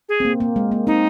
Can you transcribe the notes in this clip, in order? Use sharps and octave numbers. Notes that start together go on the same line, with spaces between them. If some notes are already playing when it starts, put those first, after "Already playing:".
G#4
C4
A#3
A#3
G#3
A#3
C4 D#4